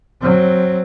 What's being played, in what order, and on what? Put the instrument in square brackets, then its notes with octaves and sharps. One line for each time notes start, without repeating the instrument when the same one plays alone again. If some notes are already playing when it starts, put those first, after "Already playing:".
[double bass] F#3 C4